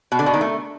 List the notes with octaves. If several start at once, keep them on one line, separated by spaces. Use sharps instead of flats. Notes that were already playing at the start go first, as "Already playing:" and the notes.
B2
D3
B2
D#3
A3